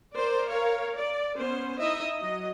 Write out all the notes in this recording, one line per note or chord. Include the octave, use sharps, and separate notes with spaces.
A#4 C5 D5
A#4 C#5 F5
D5
B3 C#4 C5
D#4 E4 D#5 E5
F#3 D#5